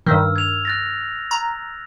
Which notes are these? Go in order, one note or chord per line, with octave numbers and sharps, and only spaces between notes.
G2 D#3 E6 F6
G#6 F7
F#6 A6 A#6
A#5